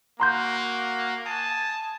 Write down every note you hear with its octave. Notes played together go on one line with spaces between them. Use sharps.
A#3 F#4 A#5 C6 G6
G#5 A5 D#6